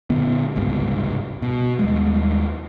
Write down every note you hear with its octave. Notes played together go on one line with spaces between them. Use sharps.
A#2 D3 B3
G#1 C#2 G2 C3
B2
D#2 G3 G#3